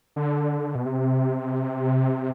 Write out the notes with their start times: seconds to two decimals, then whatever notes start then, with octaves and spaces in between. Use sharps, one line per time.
0.16 D3
0.75 B2
0.86 C3